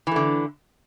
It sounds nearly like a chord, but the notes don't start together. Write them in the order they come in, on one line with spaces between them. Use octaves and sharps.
E3 A3 D3